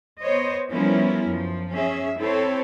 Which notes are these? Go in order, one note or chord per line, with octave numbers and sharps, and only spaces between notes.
B3 C5 C#5 D#5
F3 G3 B3 C#4 E4 A#4
F#2 F3
C#4 G#4 E5
C4 E4 A4 C5 C#5